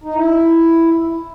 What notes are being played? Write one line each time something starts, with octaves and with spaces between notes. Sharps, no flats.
D#4
E4